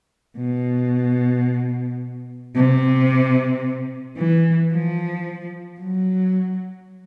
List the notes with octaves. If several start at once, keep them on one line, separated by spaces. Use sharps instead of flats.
B2
C3
E3
F3
F#3